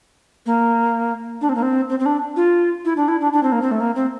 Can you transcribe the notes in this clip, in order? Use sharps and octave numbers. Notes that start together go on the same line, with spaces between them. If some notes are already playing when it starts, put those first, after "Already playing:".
A#3
D4
C4
A#3
C4
C4
C4
D4
F4
E4
D4
E4
D4
D4
C4
A#3
C4
A3
A#3
C4